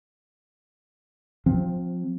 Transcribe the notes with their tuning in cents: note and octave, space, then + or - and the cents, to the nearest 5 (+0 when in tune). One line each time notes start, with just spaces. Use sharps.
F3 +20 C4 +0